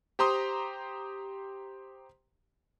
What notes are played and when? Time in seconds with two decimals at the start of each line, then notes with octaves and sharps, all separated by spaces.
0.19 G4 C5 A#5 C6 D#6